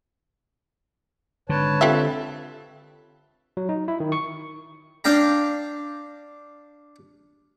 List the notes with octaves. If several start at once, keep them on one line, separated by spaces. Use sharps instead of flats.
G#1 D3 B4 C#5 A5
C4 F4 G4 A4 E5
F#3
D#4
E4
D#3
C#6
D4 F5 G5 A#5